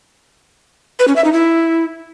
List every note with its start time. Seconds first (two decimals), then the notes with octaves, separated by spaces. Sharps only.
0.99 B4
1.08 C#4
1.16 E5
1.24 D#4
1.33 E4